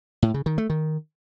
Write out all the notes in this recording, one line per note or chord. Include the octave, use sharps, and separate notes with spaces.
A2
C#3
D#3
A3
D#3